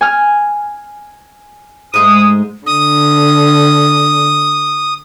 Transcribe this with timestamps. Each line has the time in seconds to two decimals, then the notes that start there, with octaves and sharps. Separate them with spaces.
0.01 G#5 F6
1.94 G#2 G#3 A3 D#6
2.66 D3 D#6